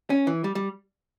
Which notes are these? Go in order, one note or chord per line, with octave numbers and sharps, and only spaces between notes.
C#4
E3
G3
G3